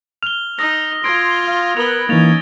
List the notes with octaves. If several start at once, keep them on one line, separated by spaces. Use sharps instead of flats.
F6 F7 G7
D#4 D#6 E6 A#6
F4 C6 G#6 D7
F5
B3 A#4 B4 F7 G7
E3 A#3 C#4 D#4 A6 F7